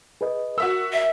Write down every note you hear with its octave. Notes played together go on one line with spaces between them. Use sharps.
G#4 B4 D#5
F#4 A#4 E5 E6
E5